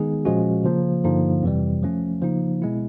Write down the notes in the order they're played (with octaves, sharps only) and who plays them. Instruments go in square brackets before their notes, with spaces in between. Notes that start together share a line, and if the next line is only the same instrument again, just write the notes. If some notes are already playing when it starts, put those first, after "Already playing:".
Already playing: [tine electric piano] D#3 G#3 B3 D#4 G#4
A#2 F3 G#3 C#4 F#4
C#3 F3 A#3
G2 D3 F3 A#3 D#4
F2 C3 E3 G3
F3 A3 C#4
C#3 F3 A#3 D#4
B2 G#3 B3 E4